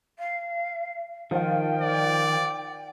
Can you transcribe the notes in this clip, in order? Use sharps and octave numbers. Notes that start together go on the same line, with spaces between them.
F5
D#3 F3 F4 G5
D5